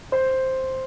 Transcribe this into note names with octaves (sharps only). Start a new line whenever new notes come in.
C5